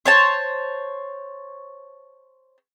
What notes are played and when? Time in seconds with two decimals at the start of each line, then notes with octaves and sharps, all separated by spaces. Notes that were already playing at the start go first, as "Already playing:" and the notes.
0.06 C5 C#5 A5